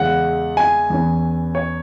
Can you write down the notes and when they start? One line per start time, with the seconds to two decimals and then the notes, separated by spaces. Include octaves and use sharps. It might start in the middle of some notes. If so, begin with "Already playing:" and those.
Already playing: E2 C#3 G#3 E4 F#5
0.57 G#5
0.90 E2 E3 C#4
1.55 C#5